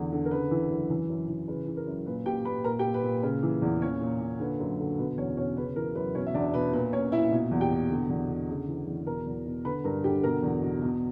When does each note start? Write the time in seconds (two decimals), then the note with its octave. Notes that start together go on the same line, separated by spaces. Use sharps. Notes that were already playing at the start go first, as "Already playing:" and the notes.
Already playing: E2 D3
0.12 D3
0.25 A#4
0.31 C#3 B4
0.51 E3
0.70 F#2
0.90 E3
1.09 F#2
1.29 E3
1.48 C#3 B4
1.67 E3
1.77 A#4
1.87 F#2
2.06 A#2 B4
2.26 A#2 G4 G5
2.45 A#2 B4 B5
2.64 A#2 A#4 A#5
2.79 G4 G5
2.84 A#2
2.94 B4
3.03 A#2
3.23 C#3
3.43 E3
3.62 E2
3.81 A#2 C#4 C#5
4.01 A#2
4.21 A#2
4.40 D3 B4
4.60 F#2
4.79 D3
4.98 B2 B4
5.18 E2 C#4 C#5
5.37 B2 C#4 C#5
5.57 C#3 B4
5.76 E3 A#4
5.95 F#2 B4
6.15 B2 C#4 C#5
6.27 E5
6.34 E2 D4 D5
6.54 B2 B4
6.73 A#2 B4
6.93 A#2 C#4 C#5
7.12 A#2 E4 E5
7.31 B2
7.51 E2
7.61 G4 G5
7.71 B2
7.90 D3
8.09 E2
8.29 D3
8.49 C#3
8.68 E3
8.87 E2
9.07 B2 A#4 A#5
9.26 E2
9.46 B2
9.65 D3 B4 B5
9.84 G2 A#4 A#5
10.04 D3 G4 G5
10.23 B2 A#4 A#5
10.43 E2
10.62 B2
10.82 B2